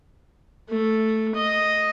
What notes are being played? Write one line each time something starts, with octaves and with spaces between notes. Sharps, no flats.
A3
D#5